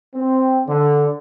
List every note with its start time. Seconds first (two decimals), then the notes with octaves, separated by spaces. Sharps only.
0.15 C4
0.67 D3